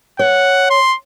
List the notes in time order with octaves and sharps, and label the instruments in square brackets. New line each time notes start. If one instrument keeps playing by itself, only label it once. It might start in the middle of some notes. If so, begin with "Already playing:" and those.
[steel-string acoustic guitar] C#5 [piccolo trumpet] F#5
[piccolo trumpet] C6